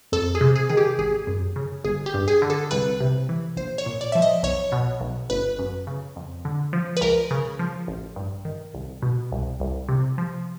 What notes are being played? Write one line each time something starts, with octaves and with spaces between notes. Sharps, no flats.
F2 A4
G#4
C3
G#4
D#3 G#4
G4
G#1 G#4
F#2
C#3
G1 G#4
G4
G2
G#4
D3
A4
C2 B4
C3
E3
A#1 C5
C#5
A#2
D5
F3 E5
D#5
B1 C#5
B2
B1
G1 B4
F#2
C#3
F2
D3
F3
B4
C#2 A#4
C#3
F3
A1
G2
D#3
C2
B2
C2
C2
C3
F3